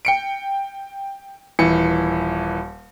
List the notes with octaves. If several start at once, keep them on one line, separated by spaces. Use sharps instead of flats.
G5 C#7 D7
D#1 E3 C#7